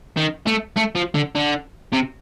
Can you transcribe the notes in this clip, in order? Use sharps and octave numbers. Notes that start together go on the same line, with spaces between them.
D#3
A3
A3
F3
D3
D3
C3